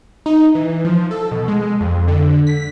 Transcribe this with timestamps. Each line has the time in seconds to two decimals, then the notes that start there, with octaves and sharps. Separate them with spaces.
0.26 D#4
0.55 E3
0.85 F3
1.11 A4
1.32 B2
1.48 G#3
1.81 F2
2.08 D3
2.47 B6